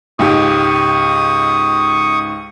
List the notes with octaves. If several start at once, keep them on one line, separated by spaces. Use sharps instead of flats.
C#2 G#2 G4 C#6 D#6